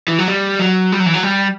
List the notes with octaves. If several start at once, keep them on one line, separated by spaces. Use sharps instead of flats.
E3
F#3
G3
F#3
G3
F#3
E3
F#3
G3